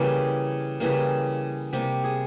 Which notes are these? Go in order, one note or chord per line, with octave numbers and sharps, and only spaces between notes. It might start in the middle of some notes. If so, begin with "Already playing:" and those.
Already playing: C#3 E3 G3 A#3 G4
C#3 E3 G3 A#3
C3 G3 A#3 G4
G#4